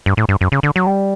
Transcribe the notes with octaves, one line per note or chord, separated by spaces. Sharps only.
G2
A2
G2
F#2
C#3
D3
F#3
G3